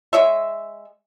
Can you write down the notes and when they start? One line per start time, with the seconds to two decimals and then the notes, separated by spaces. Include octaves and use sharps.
0.13 G#3 C#5 E5